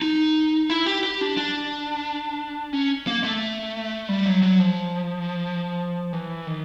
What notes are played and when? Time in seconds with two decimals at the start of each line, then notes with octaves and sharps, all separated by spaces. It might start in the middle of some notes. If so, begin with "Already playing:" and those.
0.02 D#4
0.70 E4
0.86 G4
1.03 G4
1.21 D4
1.38 D4
2.73 C#4
3.07 A#3
3.24 A3
4.08 G3
4.26 F#3
4.42 F#3
4.59 F3
6.13 E3
6.47 D#3